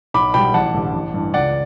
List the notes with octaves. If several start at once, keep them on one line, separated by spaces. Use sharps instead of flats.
B1 B5 D6
B2 G3 G5 B5
A1 F#5 A5
G2 D3 G3
A1
G2 E3
C#2 D5 F#5